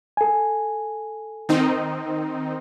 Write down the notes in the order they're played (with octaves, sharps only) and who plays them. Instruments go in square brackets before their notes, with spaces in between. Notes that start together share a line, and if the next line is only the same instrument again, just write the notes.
[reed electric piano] A4 G#5
[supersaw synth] D#3 C4 D#4